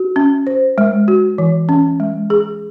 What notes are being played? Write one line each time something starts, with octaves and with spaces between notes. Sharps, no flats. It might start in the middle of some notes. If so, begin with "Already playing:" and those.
Already playing: F#4
C#4
C5
G#3
F#4
E3
C#4
G#3
G#4